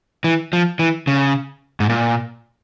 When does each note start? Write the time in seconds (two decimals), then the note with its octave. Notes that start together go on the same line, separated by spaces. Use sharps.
0.24 E3
0.53 F3
0.79 E3
1.07 C#3
1.80 G#2
1.89 A#2